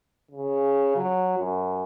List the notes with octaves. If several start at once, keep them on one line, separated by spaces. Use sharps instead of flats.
C#3
F#3
F#2